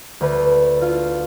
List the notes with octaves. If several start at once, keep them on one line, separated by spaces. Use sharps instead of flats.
D2 B4
F4